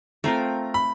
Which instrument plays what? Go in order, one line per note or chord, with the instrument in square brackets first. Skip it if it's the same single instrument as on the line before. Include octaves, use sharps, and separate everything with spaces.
[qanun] A3 C4 F4 A#4 [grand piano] A#5
[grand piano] B5